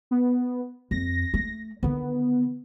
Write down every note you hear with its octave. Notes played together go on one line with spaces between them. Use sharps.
B3
F2 A#6
A3
D3 D#3 B3